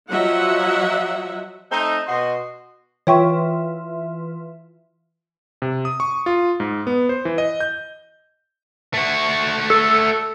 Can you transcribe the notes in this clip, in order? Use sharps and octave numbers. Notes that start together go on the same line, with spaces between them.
F3 F#3 D#5 E5 F#5
A3 C4 D#4
B2 F#4 D#5 C6
E3 F4 C#5 E5 G5 C#6
C3
D#6
C#6
F4
G#2
B3
C5
E3
D#5
G6
A3 F#4
A4